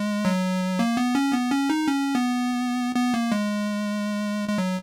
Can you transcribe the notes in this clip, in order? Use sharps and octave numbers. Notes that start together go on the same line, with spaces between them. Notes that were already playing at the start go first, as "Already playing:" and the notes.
Already playing: G#3
F#3
A#3
B3
C#4
B3
C#4
D#4
C#4
B3
B3
A#3
G#3
G#3
F#3